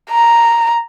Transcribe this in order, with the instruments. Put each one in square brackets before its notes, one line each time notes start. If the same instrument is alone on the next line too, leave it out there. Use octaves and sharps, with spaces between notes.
[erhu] A#5